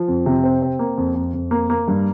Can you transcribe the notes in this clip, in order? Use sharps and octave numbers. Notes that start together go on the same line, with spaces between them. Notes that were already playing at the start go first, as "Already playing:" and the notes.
Already playing: F3
F2
C3
C4
C4
A#3
F2
F2
F2
A#3
A#3
G2